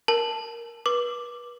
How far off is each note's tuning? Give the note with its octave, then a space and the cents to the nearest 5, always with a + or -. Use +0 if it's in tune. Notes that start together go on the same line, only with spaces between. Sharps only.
A#4 +5 A5 +0
B4 -35 D6 +0